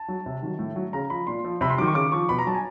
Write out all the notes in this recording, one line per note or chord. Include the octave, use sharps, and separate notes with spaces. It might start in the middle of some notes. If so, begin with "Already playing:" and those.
Already playing: A5
F#3
C3
D#3 F#3
A2
F#3
C#3 A#5
F3 B5
A#2 C6
F3
C3 B5
C6
D#3 F#3 D6
C#6
C#3 D6
F3 C#6
B2 B5
A#5
F#3 A5
G#5